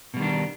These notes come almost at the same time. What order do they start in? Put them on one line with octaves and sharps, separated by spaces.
B2 G3 D#3 D4